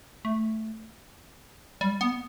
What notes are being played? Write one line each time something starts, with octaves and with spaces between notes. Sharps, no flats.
A3
G3
B3